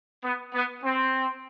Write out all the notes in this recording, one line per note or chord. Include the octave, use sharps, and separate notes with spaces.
B3
B3
C4